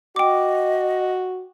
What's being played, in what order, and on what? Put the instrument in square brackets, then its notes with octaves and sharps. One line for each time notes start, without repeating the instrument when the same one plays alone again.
[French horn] F#4 [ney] D#5 [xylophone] G5 D6